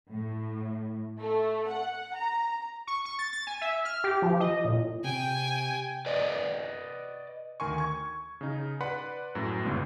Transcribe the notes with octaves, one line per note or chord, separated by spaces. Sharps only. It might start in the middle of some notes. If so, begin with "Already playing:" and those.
A2
A3
F#5
A#5
C#6
C#6
A6
A6
G#5
E5
F6
G4
F3
D#5
A#2
C3 G5 G#5
B4 D5 D#5
D2 D#3 A#4 G#5 C6 C#6
C#6 G#6
C#3 D#4
B4 D5 F#5 B5 C6
F#2 A2 F#3
G1 C#2 G2 C#3 G#3 B3